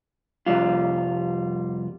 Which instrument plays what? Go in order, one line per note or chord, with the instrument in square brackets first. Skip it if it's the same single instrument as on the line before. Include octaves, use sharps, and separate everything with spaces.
[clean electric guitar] C2 F2 G3 F4